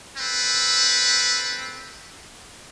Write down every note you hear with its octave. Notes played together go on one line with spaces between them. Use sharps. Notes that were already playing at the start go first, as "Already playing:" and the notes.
C4 A4 B4